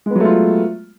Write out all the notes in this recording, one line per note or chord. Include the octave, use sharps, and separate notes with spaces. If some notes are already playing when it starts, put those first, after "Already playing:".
F#3 G#3 A3 B3 F4